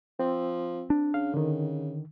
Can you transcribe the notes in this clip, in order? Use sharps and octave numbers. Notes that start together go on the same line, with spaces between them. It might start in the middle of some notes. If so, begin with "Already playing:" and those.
F3 C4
D4
C#3 F5
D3 D#3